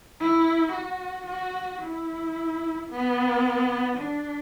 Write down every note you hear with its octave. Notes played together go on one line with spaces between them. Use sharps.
E4
F#4
F#4
E4
B3
D4